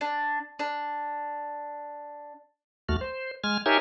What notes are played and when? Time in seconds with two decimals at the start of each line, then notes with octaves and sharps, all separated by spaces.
0.01 D4
0.59 D4
2.89 D#2 A3 F#4 F6
3.01 C5
3.44 G#3 G#5 F6
3.66 D#4 G4 A#4 C#5 E5 G#5